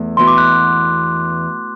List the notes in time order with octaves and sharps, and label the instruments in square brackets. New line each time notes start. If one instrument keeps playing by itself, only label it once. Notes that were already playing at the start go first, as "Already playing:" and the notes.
Already playing: [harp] E2 A3 E4
[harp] E3 B3 F#4 [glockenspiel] C6
[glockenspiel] D6
F#6